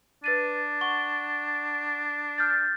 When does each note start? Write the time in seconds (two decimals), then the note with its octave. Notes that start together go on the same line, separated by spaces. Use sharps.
0.24 D4 B4 A6 D#7
0.81 F#5 C#6 G7
2.38 F6 G6 A6